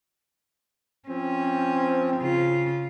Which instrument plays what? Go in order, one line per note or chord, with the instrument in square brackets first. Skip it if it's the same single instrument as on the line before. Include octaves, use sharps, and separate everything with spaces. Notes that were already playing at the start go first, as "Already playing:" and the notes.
[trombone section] F3 C4 [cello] C#4
[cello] C#3 F4